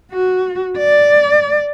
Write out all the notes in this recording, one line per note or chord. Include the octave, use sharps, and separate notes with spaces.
F#4
D5